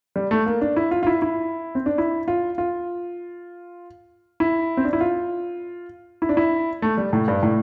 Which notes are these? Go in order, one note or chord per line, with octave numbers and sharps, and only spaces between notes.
G3
A3
A#3
D4
E4
F4
F4
E4
E4
C4
D4
E4
F4
F4
E4
C4
D4
E4
F4
E4
D4
E4
A3
G3
A2
G2
A2